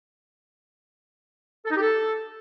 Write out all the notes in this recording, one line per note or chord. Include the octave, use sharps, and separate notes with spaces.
A4
D#4
G4
A4